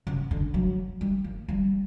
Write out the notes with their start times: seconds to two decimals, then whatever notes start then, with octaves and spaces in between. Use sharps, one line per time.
0.07 C#3
0.31 D3
0.54 F#3
1.01 G3
1.24 A#3
1.48 G3